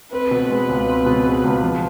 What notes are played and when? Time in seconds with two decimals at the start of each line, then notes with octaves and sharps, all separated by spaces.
0.12 C4 B4
0.31 B2
0.50 G#3 B4
0.69 C#2
0.88 C4
1.06 B2
1.24 G#3
1.44 C#2
1.62 F3